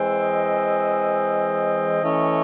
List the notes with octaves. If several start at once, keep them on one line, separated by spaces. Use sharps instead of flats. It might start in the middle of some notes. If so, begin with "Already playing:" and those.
Already playing: E3 G#3 C4
D#5
E3 A3 C#4